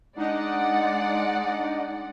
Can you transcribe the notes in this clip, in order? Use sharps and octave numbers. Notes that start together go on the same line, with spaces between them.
G#3 D4 D#4 D5 D#5 F#5